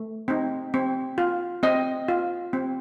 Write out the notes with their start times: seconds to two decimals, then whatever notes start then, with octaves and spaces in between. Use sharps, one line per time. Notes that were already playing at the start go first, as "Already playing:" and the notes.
Already playing: A3
0.28 C4 D#4
0.74 C4
1.18 F4
1.63 C4 D#5
2.08 F4
2.53 C4